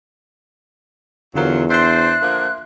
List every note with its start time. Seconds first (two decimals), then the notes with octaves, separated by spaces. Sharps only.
1.35 E2 D3 F3 F#3 F4 A#4
1.70 D4 C5 E5 C6 F#6
2.21 D3 F3 A#3